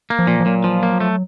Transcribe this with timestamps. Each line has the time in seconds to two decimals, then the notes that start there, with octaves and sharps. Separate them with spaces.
0.10 A#3
0.19 F3
0.27 A#2
0.40 F3
0.46 A#2 F#3
0.64 F3
0.83 A#3
1.00 A3